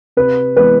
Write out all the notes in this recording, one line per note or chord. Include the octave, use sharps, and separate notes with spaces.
C3 B4
E3 G#3 B3 B4